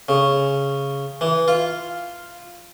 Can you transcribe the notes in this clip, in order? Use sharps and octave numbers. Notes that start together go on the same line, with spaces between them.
C#3
E3
F4